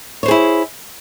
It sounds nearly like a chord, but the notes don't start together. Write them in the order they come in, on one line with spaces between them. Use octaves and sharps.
C#5 C5 G#4 E4